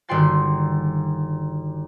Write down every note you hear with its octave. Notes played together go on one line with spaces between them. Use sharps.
G1 D#3 F#4 G5 C6 A6